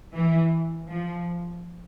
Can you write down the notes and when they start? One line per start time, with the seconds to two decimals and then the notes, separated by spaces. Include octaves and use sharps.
0.14 E3
0.89 F3